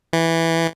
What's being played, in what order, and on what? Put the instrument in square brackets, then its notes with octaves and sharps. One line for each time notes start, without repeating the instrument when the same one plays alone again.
[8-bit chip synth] E3